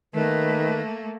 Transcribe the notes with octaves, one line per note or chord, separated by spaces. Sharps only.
D#3 A3 A#3 B4